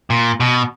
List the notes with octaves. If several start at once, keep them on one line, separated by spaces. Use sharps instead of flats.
A#2
B2